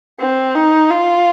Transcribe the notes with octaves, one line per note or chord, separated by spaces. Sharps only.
C4
D#4
F4